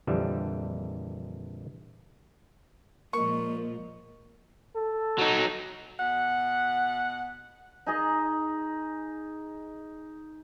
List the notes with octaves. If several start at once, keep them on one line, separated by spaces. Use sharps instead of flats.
A#1 F2 D3 E3 G3 E5
A#2 F3 G#3 A#3 A#4 D#5 C#6
A4
F#3 D#4
B2 F#5
D#4 G#4 D#5